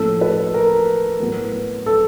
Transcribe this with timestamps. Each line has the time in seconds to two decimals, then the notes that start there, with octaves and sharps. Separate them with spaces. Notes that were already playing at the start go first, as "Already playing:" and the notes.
Already playing: A2 F3 A#3 C#4 A4
0.21 B4
0.54 A#4
1.20 A2 F#3 B3
1.86 A4